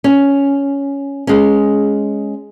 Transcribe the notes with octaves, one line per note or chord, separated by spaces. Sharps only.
C#4
G#3 C#4